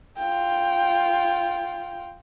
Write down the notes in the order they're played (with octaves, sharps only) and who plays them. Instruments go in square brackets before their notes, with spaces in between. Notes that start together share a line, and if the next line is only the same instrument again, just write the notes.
[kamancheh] F4 G5